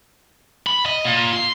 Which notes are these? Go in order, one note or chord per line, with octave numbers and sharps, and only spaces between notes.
B5
D#5
A#2
C6